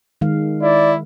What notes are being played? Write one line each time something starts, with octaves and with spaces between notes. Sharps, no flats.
D#3 G#3 F5
E4 D5